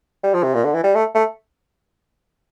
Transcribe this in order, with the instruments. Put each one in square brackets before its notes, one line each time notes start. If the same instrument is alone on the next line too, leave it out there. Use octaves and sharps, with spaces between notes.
[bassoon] G3
F3
C3
A#2
D3
E3
G3
A3
A3